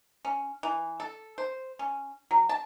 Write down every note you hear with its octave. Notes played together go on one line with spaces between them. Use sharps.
C#4
E3
A4
C5
C#4
F#3
A5